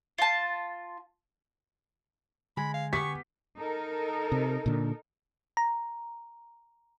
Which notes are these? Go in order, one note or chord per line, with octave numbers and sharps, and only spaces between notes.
F4 A5
D3 G#3 G#5 B5 G#6
F5
B3 G4 C#6 B6
D#4 A4 A#4
C3
A#2 D3
A#5